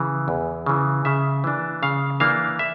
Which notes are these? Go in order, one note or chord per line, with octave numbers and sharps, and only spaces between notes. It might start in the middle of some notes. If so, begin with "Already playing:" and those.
Already playing: C#3 E3
E2
C#3 E3
C#3 E5
E3 A#3 D4
C#3 F5
E3 A#3 D4 F5
E5